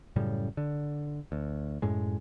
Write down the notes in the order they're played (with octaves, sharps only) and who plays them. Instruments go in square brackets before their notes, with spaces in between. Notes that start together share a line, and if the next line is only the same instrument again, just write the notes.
[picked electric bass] F#2 A2 C#3 G3
D3
D2
F#2 A2 G#3